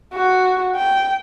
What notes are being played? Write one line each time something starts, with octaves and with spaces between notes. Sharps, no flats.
F#4
G5